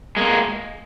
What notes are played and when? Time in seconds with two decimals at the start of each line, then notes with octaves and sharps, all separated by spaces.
0.17 G#3 A#3